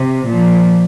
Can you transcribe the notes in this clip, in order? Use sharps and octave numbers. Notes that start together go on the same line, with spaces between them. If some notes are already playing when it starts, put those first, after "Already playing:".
Already playing: C3
A#2 F3